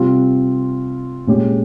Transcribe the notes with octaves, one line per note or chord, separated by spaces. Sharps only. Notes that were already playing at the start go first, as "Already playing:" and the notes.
Already playing: C3 G3 C4 F4
A#2 G#3 C#4 G4